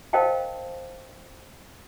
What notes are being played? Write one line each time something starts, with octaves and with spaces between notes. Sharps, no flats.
A#4 C5 D#5 F5 G5 A5